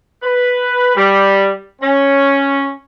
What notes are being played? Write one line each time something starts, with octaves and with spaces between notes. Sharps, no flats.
B4
G3
C#4